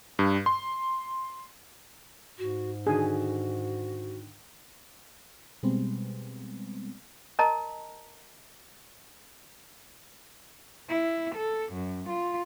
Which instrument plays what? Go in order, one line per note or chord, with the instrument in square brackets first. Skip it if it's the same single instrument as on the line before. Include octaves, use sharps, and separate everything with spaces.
[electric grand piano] G2
C6
[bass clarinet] G#2 [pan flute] F#4
[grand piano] D3 D#3 [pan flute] F#4 [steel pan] G#4
[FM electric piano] B2 G3 G#3 B3 C4
[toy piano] A#4 D#5 A5 A#5
[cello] E4
A4
F#2
F4